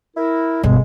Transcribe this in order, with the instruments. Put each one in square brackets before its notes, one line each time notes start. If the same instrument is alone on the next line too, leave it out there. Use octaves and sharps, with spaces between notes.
[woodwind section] E4 A#4
[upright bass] G1 B2 [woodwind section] G#3